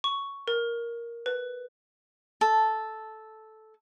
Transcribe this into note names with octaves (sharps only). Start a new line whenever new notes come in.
C#6
A#4
B4
A4